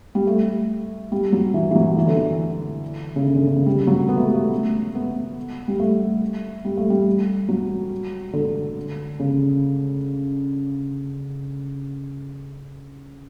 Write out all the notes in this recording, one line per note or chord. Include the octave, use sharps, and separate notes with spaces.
G3
A3
G3
F#3
E3
E3
F#3
E3
D3
E3
C#3
D3
D3
C#3
C#3
G3
F#3
B3
A3
G3
A3
B3
G3
A3
G3
A3
G3
F#3
D3
C#3